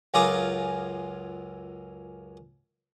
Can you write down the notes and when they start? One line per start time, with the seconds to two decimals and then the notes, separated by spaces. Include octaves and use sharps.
0.14 C#2 F#2 F4 G#4 A#5 D6